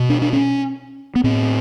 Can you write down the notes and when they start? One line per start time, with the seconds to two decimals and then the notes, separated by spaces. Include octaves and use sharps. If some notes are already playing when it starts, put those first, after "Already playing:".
Already playing: B2
0.10 D4
0.22 D4
0.33 C#4
1.15 B3
1.24 A2 C4